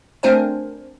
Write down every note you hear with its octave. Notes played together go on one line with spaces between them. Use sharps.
A3 C4 D4 A#4 C5 G#5